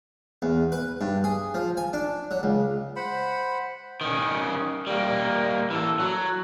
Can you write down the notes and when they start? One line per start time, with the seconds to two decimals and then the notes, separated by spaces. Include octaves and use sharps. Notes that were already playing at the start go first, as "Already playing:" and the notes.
0.42 E2
0.72 B4
1.01 G2
1.24 G#4
1.54 F3
1.77 G#5
1.93 D4
2.31 F#3
2.43 C#2
2.96 C5 F#5 B5
4.01 D#3 C#4
4.87 G3 A#3
5.70 E3 A4
6.00 F#3